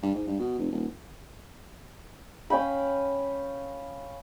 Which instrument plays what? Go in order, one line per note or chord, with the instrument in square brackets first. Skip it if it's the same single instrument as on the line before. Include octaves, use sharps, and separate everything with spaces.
[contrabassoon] G2
G#2
G2
B2
F1
D#1
[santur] C#4 F5 G5 B5